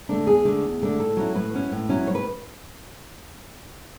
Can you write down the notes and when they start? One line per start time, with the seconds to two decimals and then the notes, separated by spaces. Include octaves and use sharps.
0.09 D3 A3 D4
0.27 E2 G#4
0.45 D3 A3 D4
0.63 E2
0.82 D3 A3 D4
0.99 A2 A4
1.17 F#3 C#4 E4
1.35 A2 B4
1.53 F#3 C#4 E4
1.72 A2
1.89 F#3 C#4 E4
2.07 A2 C#5
2.15 B4